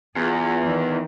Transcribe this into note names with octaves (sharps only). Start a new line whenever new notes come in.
E2 F4 G#4
D#3 E3